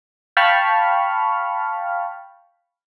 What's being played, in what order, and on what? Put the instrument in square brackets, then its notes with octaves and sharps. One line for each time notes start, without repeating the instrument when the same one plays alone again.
[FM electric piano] F5 G5 A5 B5 C#6 F6